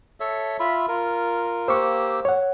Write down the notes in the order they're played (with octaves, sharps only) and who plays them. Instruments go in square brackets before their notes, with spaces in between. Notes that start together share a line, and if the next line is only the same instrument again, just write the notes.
[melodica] A4 C#5 E5
F4 E5 B5
F4 A#4
[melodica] A#3 G4 E6 [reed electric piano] C5 C#6
[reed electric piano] C#5 F#5